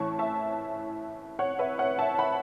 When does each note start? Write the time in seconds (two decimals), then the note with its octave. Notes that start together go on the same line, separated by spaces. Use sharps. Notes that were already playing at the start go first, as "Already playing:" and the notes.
Already playing: A2 E3 C#4 A5 C#6
0.19 E5 A5
1.39 C#5 F#5
1.59 B4 E5
1.78 C#5 F#5
1.99 E5 A5
2.18 F#5 B5